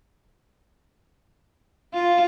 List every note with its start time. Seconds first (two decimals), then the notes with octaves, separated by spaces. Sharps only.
1.94 F4